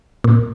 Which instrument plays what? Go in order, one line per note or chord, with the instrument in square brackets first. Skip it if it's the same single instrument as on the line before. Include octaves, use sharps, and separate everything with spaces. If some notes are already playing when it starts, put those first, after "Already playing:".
[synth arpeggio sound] A#2